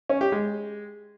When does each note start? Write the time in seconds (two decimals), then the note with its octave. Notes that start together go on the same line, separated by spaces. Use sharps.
0.09 C#4
0.21 G4
0.32 G#3